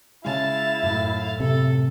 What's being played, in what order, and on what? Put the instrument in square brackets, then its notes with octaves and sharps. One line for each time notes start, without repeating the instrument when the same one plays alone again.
[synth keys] C#3 G#3 [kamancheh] E4 [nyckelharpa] F5 A5
[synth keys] F#2 A2
[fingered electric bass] C3 [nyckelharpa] A4